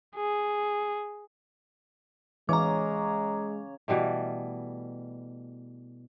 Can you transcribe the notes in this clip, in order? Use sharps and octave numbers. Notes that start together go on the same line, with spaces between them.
G#4
C#3 E3 G#3 C#5 A#5 D6
B2 E3 G3 A3